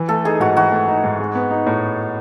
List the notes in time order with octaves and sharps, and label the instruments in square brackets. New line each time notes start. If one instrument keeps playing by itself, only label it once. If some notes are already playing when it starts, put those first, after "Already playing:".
Already playing: [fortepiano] E3
[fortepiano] A3 [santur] A4
[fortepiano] D#4 [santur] G#4
[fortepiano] G#2 [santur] F#4
[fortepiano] E3 [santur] F#4
[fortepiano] A3
D#4
G#2
G#3
B3
D#4
A2